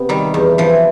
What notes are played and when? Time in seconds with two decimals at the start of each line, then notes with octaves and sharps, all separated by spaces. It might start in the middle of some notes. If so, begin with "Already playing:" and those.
Already playing: C3 B3
0.09 D#3 G3
0.34 E2
0.58 E3 F3